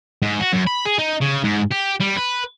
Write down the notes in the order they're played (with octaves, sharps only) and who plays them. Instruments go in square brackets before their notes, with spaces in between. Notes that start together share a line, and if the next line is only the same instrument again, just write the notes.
[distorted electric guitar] G#2
F#4
F#2
B5
G#4
D#4
C#3
G#2
G4
G3
B4